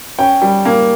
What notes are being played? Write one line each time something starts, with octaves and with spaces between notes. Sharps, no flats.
C#4 G5
G3
A#3